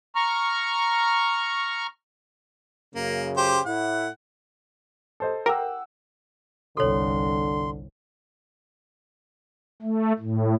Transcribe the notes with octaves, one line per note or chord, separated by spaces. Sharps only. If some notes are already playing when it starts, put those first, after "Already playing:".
A#5 C#6 F6
F#2 C#3 A#3
G4 C5
A2 E4 F#5
A4 C5 D#5
G4 A#4 F#5 E6
G1 C2 D3 A4 C#5 C6
A3
A2